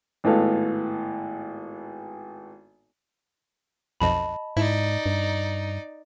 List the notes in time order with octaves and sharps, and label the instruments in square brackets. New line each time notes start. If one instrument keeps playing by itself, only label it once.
[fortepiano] G#1 A2 B3 A4 F5
[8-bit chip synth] B1 F2 [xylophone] D#5 A5 B5
[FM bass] G#2 [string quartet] D#4 D5 [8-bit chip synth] E4
[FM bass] G2